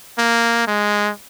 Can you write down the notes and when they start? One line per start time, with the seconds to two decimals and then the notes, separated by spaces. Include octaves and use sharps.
0.18 A#3
0.67 G#3